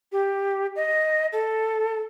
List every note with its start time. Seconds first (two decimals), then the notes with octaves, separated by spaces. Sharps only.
0.12 G4
0.76 D#5
1.32 A4